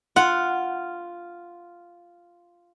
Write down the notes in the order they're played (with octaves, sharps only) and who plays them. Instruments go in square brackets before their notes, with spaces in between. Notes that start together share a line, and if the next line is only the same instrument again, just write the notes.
[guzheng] F4 F#5